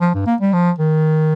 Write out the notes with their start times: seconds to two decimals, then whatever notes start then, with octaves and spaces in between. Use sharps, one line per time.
0.01 F3
0.14 G2
0.26 A#3
0.40 G3
0.53 F3
0.78 D#3